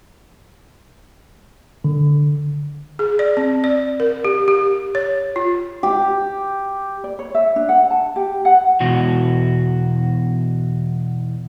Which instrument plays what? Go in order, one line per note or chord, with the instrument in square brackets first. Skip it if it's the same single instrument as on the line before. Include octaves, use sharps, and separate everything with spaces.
[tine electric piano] D3
[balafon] G#4
D5
C4
D5
A#4
G4
G4
C#5
F4
[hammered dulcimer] G4
[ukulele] D5
C#5
E5
D4
F#5
A5
G4
F#5
[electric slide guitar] E2 B2 F#4